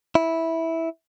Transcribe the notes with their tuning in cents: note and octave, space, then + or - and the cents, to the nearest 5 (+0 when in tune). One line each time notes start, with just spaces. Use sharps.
E4 -10